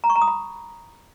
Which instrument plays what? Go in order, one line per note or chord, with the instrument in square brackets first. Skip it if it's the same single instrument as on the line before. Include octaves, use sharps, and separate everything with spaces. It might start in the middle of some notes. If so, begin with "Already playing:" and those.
[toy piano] A#5
C#6
A#5
D#6
B5